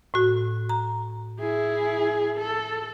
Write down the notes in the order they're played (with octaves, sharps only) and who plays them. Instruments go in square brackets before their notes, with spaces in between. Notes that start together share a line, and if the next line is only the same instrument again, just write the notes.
[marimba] A2 F#4
A#5
[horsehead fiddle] E4 G#4
A4